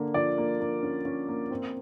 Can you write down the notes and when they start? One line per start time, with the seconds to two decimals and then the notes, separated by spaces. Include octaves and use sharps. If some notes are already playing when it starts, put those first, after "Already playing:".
Already playing: D3 A#3
0.14 F3 D5
0.38 A#3
0.60 A#3
0.82 C#4
1.05 C#4
1.28 A#3
1.51 C4